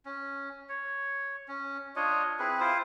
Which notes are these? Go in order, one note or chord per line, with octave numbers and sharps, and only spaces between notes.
C#4
C#5
C#4
D4 F4 C#5 D#5
C4 E4 G#4 B4
E4 F4 C5